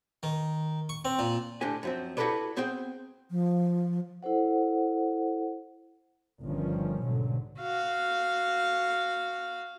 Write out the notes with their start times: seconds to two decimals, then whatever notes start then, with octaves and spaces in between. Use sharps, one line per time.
0.23 D#3
0.89 C#6
1.05 C4
1.19 A#2
1.61 A2 D3 D4 G4 G#5
1.83 F#2 F3 C4
2.17 E4 F#4 G4 A4 B4 D5
2.56 B3 C4 G#4 C5 G5
3.31 F3
4.23 E4 A4 C5 F#5
6.44 G1 D#3 F3 G3 C#4
7.04 B1 G#2 D3 F#3
7.60 F#4 F5